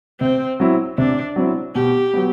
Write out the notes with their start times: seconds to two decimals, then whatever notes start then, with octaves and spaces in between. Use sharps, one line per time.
0.20 C3 C4
0.60 F#3 C4 E4
0.98 C3 D4
1.36 F#3 C4 E4
1.75 B2 G4
2.13 F#3 B3